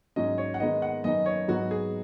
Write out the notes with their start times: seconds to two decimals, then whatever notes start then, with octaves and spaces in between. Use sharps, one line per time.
0.16 G#2 F#3 C#4 D#5
0.38 C#5
0.54 F#5
0.60 D#3 G#3 B3 D#4 D#5
0.82 F#5
1.04 F#2 D#3 B3 D#4 D#5
1.26 C#5
1.48 G#2 F#3 B3 D#4 F#4
1.71 G#4